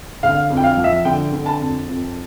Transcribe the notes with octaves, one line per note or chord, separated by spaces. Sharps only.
D3 F5
F2
G5
F5
F3
E5
D3 G5
D3
A5
F2
F2